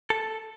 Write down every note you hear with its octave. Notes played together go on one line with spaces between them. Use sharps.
A4